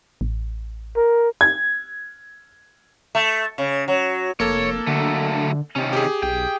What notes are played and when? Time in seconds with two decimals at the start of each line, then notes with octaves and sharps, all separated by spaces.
0.21 A1
0.96 A#4
1.41 G#6
3.15 A3
3.58 C#3
3.88 F#3
4.40 F1 A#3 A4 C#5
4.87 D3 F#3 A3
5.76 C3 D#3 C#4
5.93 G4 G#4
6.23 B1 G5